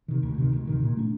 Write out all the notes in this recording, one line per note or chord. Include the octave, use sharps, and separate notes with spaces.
C3 D#3
D2
C3 D#3
D2
C3 D#3
A#2
A3 D4